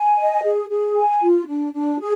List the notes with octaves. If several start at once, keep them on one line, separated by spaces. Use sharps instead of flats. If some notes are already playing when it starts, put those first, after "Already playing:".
Already playing: G#5
D#5
G#4
G#4
G#5
F4
D4
D4
G#4